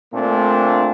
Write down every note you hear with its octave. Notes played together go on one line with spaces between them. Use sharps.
A#2 A3 A#3 C4 D4